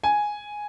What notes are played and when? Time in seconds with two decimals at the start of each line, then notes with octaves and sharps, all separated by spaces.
0.04 G#5